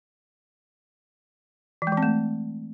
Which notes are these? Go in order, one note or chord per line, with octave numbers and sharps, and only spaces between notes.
E3
G#3
E3
C4
A3